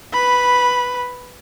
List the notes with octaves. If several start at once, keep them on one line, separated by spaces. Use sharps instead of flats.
B4 B5